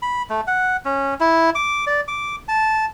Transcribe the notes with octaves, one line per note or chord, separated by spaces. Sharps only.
B5
A3
F#5
C#4
E4
D6
D5
D6
A5